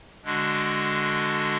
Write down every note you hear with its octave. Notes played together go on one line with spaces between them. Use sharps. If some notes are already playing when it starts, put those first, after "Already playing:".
D3 G#3 D4 F#4